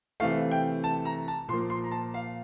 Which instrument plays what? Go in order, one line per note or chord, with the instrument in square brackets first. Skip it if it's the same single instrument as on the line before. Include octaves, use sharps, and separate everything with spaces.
[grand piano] C3 E3 A3 F5
G5
A5
A#5
A5
A#2 C6
F3 A#3
C6
A#5
A5
F5